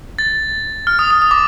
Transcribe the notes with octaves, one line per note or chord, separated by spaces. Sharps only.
A6
F6
D#6
D#6
D#6
D6